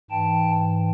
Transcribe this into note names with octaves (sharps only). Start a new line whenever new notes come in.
G#2 E3 G5 A5